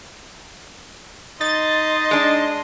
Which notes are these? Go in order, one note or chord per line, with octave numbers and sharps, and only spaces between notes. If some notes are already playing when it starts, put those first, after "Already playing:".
D#4 D#5 C6 A6
G#3 D4